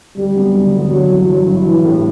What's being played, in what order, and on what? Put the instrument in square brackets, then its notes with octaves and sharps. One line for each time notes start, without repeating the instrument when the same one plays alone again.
[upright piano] D2 [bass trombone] G3
[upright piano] D3 F#3 B3
D2
D3 F#3 B3
[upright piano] G1 [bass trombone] F#3
[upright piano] G2 E3
[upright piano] G1 [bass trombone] F#3
[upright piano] G2 E3
[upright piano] A1 [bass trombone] E3
[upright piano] A2 G3 D4 A4